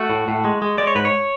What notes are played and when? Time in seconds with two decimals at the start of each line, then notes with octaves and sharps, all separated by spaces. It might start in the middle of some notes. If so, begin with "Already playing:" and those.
Already playing: A3 F#4
0.10 A2
0.28 A2
0.45 G#3
0.62 G#3
0.78 G#3 D5
0.87 C#5
0.95 G#2 B4
1.05 C#5